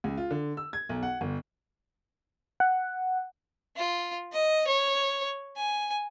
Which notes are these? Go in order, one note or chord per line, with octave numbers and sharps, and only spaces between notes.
C#2
F4
D3
E6
G#6
B1
F#5
G1
F#5
F4
D#5
C#5
G#5